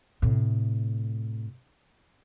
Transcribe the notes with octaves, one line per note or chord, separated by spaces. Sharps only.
A2 C3